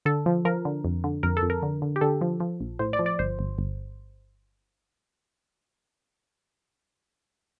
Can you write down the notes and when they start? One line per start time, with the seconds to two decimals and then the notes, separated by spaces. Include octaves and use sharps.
0.05 D3 A4
0.26 F3
0.45 F3 A#4
0.65 D3
0.84 F2
1.04 D3
1.23 F2 A#4
1.37 A4
1.43 F2
1.50 A#4
1.63 D3
1.82 D3
1.96 G4
2.01 D3 A4
2.21 F3
2.40 F3
2.61 A#1
2.79 A2 C5
2.93 D5
2.99 F3
3.06 D5
3.19 G1 C5
3.39 G1
3.58 G1